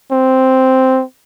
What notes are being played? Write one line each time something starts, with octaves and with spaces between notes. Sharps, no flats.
C4